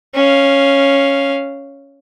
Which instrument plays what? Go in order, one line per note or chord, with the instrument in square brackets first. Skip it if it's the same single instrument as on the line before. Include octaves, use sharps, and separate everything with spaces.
[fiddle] C#4 F5